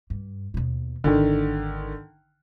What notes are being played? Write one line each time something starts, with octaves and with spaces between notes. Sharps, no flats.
G2
D#2 B2
G#1 D3 D#3